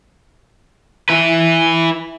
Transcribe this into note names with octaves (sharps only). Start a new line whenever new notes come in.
E4 B4